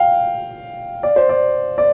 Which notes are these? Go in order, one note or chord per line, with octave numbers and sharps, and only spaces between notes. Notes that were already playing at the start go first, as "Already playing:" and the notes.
Already playing: F5 G5
D5
C5
D5
D5